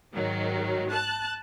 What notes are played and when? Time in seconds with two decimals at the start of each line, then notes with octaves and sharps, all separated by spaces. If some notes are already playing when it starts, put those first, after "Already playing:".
0.13 G#2 D#3 F#3
0.90 A5 F#6